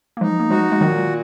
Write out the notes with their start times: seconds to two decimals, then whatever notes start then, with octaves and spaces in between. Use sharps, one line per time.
0.17 A#3
0.21 F3 G#3 D#4
0.40 A#3
0.50 F3 G#3 F#4
0.72 G#3
0.81 A#2 D#3 F#3